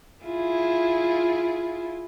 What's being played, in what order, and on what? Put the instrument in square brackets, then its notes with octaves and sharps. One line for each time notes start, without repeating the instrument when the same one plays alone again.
[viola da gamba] E4 F4 G#4